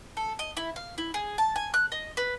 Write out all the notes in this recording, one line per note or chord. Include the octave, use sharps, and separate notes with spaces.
A4
D#5
E4
F5
E4
G#4
A5
G#5
F#6
D#5
B4